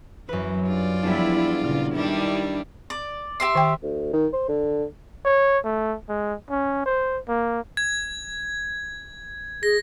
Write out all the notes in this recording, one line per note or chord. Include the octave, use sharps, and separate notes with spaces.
F#2 E3 B4
G2 F4 D5
E2 F3 G3 D4 E4
A#2 C#3 F6
D#3 G3 D4 E4
D5
G4 E5 C6
D#3 G5
D2
D#3
C5
D3
C#5
A3
G#3
C#4
C5
A#3
G#6
G#4 A#6